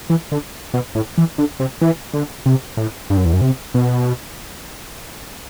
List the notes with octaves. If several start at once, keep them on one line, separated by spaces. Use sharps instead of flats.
E3
D3
B2
A2
E3
D3
C3
E3
D3
C3
A2
G2
F#2
E2
F#2
C3
B2